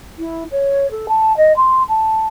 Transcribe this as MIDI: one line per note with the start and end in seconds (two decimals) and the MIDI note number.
0.18 0.43 64
0.51 0.90 73
0.91 1.06 69
1.08 1.36 81
1.37 1.53 75
1.56 1.83 84
1.88 2.27 81